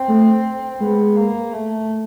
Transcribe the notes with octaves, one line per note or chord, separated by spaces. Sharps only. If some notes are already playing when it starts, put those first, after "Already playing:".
Already playing: C4
A3
G#3 B3
A#3
A3